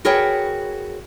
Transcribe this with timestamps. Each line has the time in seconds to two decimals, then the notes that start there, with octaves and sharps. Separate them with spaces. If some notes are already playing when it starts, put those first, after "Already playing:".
0.05 F#4 G#4 A#4 B4 C#5 G5